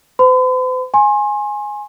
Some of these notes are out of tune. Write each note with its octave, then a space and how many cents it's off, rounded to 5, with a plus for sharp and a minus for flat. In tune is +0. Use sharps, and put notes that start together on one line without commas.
C5 -45 B5 +45
G#5 +0 C6 +35